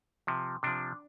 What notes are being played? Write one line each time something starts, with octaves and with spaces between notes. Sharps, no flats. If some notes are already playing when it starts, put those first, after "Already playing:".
C3 F3
C3 F3 D4